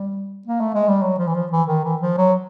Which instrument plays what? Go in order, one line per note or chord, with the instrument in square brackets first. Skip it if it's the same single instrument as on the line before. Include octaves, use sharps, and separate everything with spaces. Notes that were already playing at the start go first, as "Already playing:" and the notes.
Already playing: [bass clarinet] G3
A#3
A3
G#3
G3
F#3
F3
E3
F3
E3
D#3
E3
F3
F#3